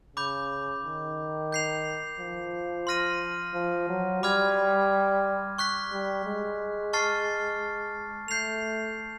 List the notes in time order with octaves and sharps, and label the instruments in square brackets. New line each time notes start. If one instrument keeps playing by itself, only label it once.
[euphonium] C#3 [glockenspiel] B5 D6 G6
[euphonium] D#3
[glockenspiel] G6 C7 F7
[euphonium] F3
[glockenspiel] C6 F6 A#6 D#7
[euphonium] F3
F#3
[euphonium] G3 [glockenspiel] B5 D6 F6 G#6
[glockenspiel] C#6 F#6 B6
[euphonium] G3
G#3
[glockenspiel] A5 C#6 F6 A6 C7
[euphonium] A3 [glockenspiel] G6 C7 F7